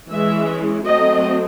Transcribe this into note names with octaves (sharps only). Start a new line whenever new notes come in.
E3 G#3 C#4 E5
F#3 A3 C4 D#5